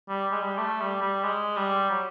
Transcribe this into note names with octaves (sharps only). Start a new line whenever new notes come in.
G3
G#3
G3
A3
G3
G3
G#3
G3
F#3